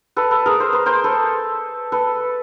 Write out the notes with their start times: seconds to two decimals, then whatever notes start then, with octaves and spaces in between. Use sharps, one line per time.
0.17 A4 B4
0.31 A4 B4
0.46 G#4 A#4
0.60 C5
0.73 B4
0.86 A#4 C5
1.04 A4 B4
1.92 A4 B4